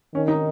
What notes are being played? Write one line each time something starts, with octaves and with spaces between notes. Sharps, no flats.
D#3 C#4
D#4